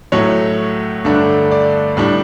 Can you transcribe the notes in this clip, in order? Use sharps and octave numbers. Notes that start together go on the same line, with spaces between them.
A2 F#3 A3 C#5
G2 D3 A3 D4
D5
A2 G3 D4